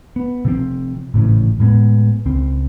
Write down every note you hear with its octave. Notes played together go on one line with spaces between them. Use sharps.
B3
C3 F3 C4
G#1 A2 C#3 E3
A2 G#3 B3
C#2 C4